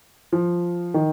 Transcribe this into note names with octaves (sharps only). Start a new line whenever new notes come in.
F3
D#3